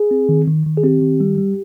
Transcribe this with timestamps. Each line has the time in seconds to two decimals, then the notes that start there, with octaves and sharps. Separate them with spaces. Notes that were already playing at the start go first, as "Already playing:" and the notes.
Already playing: G#4
0.11 C4
0.29 D#3
0.48 D#3
0.66 D#3
0.77 G#4
0.84 C4 G4
1.02 D#3
1.20 G3
1.38 G3